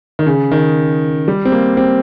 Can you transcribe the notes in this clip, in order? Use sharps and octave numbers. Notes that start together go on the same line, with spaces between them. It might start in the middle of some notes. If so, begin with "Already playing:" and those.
D#3
C#3
D#3
G3
C4
A#3
C4